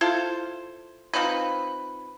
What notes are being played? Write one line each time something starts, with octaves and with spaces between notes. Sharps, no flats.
E4 F4 A4 C5
F3 C4 D#4 B4